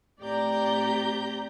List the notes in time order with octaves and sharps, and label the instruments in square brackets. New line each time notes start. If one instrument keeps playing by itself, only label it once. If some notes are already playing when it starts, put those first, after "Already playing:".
[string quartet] A2 C4 G4 D5 A#5 G6